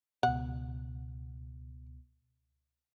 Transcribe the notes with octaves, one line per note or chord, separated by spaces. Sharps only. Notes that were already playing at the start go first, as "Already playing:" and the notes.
C#2 B2 F#5